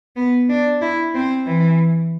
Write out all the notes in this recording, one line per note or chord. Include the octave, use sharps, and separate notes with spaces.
B3
D4
E4
C4
E3